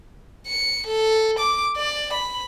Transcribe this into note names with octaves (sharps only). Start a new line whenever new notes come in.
C#7
A4
D6
D5
B5